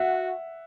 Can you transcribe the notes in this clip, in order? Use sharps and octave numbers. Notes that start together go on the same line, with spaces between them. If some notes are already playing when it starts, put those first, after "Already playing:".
Already playing: F#4 E5 F#5